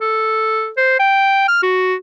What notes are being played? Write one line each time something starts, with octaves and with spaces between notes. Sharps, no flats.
A4
C5
G5
F6
F#4